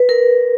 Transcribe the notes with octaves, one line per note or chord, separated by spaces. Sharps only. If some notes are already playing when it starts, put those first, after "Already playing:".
Already playing: B4
A#4